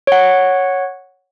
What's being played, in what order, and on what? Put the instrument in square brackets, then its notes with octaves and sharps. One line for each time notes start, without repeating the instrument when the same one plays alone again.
[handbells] C#5 F#5